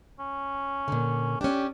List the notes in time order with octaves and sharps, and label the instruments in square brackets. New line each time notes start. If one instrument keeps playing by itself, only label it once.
[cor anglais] C#4
[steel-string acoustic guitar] A#2 D3
[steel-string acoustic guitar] C#4 D4 [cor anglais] G4